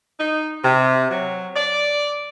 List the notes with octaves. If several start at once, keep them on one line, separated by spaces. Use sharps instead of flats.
D#4
C3
F#3
D5